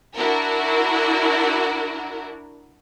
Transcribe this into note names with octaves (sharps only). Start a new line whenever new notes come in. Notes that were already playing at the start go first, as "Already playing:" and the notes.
D4 E4 F#4 A#4